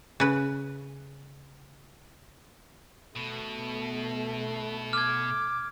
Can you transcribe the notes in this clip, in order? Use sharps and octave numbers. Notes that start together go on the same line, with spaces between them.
C#3 B4
B2 A3 B3
D6 F6 G#6